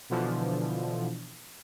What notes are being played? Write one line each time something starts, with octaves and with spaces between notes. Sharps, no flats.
B2 D3 E3 F3